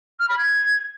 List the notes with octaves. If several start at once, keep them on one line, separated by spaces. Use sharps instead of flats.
F6
B5
G#6